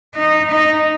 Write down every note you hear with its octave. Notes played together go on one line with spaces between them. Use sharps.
D#4
D#4